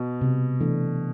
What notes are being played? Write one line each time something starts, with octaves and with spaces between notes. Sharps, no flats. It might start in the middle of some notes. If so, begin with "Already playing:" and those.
Already playing: B2
C3
E3 A3 D4 A4